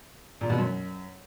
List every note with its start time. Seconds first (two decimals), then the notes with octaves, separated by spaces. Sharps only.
0.41 A#2
0.50 B2
0.58 F#2